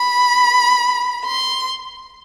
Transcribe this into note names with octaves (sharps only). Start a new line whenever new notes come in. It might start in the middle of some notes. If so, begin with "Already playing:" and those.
Already playing: B5
C6